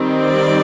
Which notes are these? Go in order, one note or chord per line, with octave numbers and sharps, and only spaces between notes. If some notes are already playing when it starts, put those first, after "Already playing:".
Already playing: D#3 G3 C4
D5